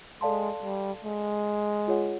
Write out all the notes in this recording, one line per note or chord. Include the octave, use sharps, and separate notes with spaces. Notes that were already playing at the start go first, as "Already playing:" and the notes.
G#3 A4 D5 F5 A5 C6
G3
G#3
F4 G#4 C#5 F#5